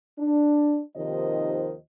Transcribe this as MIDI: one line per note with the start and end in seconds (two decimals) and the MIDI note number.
0.18 0.81 62
0.97 1.74 39
0.97 1.74 48
0.97 1.74 51
0.97 1.74 53
0.97 1.74 72
0.97 1.74 75